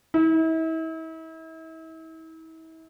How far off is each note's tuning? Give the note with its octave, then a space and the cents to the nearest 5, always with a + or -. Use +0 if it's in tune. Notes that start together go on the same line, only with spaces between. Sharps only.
E4 -40